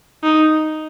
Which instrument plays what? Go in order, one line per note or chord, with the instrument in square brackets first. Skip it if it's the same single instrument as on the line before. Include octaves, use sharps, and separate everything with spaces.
[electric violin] D#4